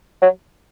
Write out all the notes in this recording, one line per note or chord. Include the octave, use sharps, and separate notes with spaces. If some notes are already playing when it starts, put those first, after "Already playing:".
F#3